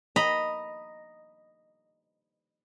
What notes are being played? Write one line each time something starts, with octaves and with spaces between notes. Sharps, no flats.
D#5 A#5 B5